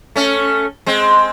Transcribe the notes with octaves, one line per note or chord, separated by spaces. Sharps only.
A3 C#4
G#3 C4